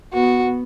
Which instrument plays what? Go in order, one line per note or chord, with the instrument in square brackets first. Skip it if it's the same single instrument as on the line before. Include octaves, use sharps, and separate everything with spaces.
[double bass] B3 [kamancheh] F#4